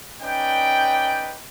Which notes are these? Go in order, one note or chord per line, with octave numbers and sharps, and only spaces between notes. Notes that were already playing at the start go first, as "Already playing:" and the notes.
C#4 D#4 B4 D5 G5